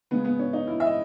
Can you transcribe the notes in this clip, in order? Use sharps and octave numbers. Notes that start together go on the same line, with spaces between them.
C#3 G#3 B3
B3
C#4
D#4
E4
E5
D#5